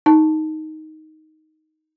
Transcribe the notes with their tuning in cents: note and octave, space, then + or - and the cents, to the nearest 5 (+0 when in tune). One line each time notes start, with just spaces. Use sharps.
D#4 +5 A5 +0